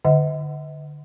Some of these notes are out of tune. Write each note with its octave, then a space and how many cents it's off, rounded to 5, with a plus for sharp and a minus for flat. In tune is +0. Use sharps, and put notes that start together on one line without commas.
D3 +15 D#5 +40 F#5 +0